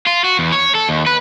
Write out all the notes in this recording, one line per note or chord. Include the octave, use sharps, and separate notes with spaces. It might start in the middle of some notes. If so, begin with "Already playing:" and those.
F4
F#4
E2
C#5
A4
D#2
B4